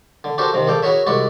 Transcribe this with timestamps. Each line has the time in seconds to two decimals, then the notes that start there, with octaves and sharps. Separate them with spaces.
0.24 D3
0.38 D4 F#4 G4 A4 A#4 C5
0.53 C3 D#3 F3
0.67 A#1 A4 D5 F5 G5
0.83 E4 F#4 G#4 A#4 C#5 E5
1.07 C2 G#3 E4 F#4 D5 C#6